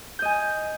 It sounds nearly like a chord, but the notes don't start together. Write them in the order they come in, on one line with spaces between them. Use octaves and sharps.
G6 D#5 G#5